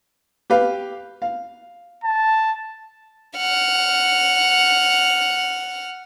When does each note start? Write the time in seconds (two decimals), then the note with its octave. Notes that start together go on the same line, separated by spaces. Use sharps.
0.50 G4 B4 F5
1.22 F5
2.04 A5
3.36 F#5 F6